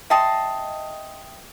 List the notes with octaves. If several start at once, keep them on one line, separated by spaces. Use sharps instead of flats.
D#5 E5 G5 A5 C6 D#6